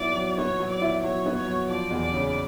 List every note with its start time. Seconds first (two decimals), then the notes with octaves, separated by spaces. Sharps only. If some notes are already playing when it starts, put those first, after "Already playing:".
Already playing: F#3 B3 E4 D5
0.16 F#3
0.37 B3 C#5
0.60 F#3
0.70 D5
0.81 E4
1.03 F#3 C#5
1.26 B3
1.36 C#5
1.46 F#3
1.69 F3 D5
1.91 E2
2.02 D5
2.12 C#3